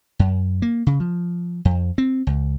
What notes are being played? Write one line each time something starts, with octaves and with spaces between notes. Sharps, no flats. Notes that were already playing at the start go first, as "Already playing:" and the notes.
F#2
A#3
C#3
F3
F2
C4
C#2